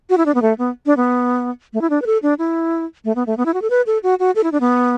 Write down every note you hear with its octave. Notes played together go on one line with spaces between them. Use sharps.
F#4
E4
D4
B3
A3
B3
D4
B3
A3
E4
D4
B4
A4
D4
E4
A3
B3
A3
B3
E4
F#4
A4
B4
A4
F#4
F#4
A4
E4
D4
B3